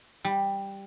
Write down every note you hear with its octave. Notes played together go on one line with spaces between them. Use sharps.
G3